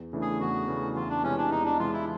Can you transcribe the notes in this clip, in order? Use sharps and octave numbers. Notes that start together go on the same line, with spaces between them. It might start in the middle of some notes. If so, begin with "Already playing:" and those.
Already playing: E2
C#3 E3 A3 D4
G#4
E2 F#4
C#3 E3 A3 D4
E2 F4
D4
C3 E3 G#3 C#4
D4
E2 D#4
D4
C3 E3 G#3 F4
E4